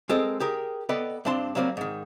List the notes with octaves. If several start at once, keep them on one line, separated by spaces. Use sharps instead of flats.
G#3 C4 A4 A#4 D#5
G4 G#4 A#4
B3 A4 B4 D5 D#5 G5
G2 C4 D4 A5 C6
F#3 G3 A#3 C4 D5
G#2 D#3